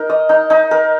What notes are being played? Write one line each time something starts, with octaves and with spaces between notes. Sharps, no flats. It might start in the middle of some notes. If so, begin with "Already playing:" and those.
Already playing: D#4 A#4
D#5
D#4
D#4
A#4